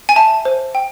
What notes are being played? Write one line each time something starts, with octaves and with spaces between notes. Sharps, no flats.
G#5
E5 A5
C5
G5